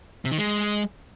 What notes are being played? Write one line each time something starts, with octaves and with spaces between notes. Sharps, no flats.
C3
D#3
G#3